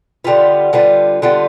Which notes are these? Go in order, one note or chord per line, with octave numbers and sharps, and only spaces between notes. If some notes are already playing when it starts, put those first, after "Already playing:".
D3 G3 B3 F4
D3 G3 B3 F4
D3 G3 B3 F4